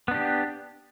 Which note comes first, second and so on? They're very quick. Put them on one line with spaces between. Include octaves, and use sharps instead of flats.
B3 D4 G4